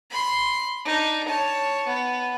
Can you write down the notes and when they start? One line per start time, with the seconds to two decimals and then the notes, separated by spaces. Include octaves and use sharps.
0.11 B5 C6
0.85 D4 D#4
1.28 C#5 A5
1.87 B3